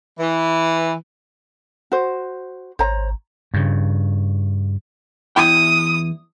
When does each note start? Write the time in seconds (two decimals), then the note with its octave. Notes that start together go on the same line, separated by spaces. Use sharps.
0.20 E3
1.92 F#4 C5
2.79 G#1 C5 C#5 A#5
3.54 G2 C#3
5.36 E2 E4 G5 D#6